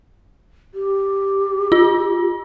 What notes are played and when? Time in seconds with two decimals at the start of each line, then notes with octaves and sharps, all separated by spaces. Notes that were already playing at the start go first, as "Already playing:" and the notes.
0.74 G4
1.72 F4